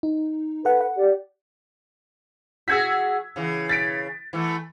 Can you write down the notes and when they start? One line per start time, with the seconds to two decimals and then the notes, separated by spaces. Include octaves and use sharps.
0.03 D#4
0.65 A4 B4 F#5
0.81 F#5
0.96 G4 D5
2.68 F#4 G#4 E6 G#6 B6
3.36 C#3 E3
3.69 A6 B6 D7
4.33 E3 A3